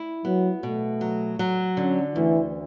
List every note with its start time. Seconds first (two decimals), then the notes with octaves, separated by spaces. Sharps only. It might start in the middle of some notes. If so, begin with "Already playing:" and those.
Already playing: E4
0.25 F#3 B3
0.63 B2 A3
1.01 F#3
1.39 F#3
1.77 D3 C#4
2.15 D2 E3